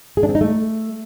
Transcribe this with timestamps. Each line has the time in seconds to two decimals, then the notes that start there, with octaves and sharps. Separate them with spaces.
0.17 G#4
0.23 D4
0.29 C4
0.35 D#4
0.41 A3